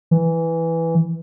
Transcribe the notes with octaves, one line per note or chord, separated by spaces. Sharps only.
E3